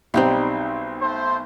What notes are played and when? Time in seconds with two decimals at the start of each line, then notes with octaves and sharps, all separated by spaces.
0.14 B1 G3 C4 D#4 G4
1.02 A3 C5